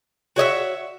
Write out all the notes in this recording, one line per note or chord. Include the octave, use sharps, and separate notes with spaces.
F#4 C#5 D#5 E5